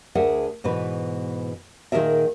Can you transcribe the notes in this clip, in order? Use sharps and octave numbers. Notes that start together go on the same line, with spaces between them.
D2 G#4 A#4 E5 F#5
G#2 B2 E3 B4
A#2 D#3 F#3 G#4 A#4 E5